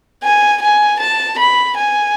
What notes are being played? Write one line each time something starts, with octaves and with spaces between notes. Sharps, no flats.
G#5
G#5
A5
B5
G#5